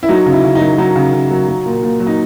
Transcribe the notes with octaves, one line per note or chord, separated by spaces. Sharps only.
E4
F#3 D#4
C#3
E4
C#3
D#4
F#3
F#3 D#4
C#3
C#3
F#3
F#3
A#2
A#2
F#3
D#4